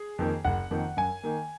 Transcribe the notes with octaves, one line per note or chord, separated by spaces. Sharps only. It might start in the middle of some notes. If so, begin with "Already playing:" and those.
Already playing: G#4
F2 D#3 A#3
F#1 F#5
F2 D#3 A#3
F#2 G#5
D#3 A#3